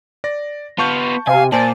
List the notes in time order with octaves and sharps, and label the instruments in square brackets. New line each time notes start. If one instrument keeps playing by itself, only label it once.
[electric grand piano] D5 A#6
[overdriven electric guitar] B3 F4 [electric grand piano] A5 C#6 G6
[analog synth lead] C3 [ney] F5 [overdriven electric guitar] G#5
[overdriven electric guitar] A#2 [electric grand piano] C5 A5 [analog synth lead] D5 [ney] G#5